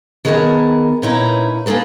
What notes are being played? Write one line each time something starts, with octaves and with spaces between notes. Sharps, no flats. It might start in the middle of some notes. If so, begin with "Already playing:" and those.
D#3 B3 G#4 A#4 D#5 A5
A#2 C#4 D#4 E4 B4 A#5
A#3 D#4 G#4 A4 B4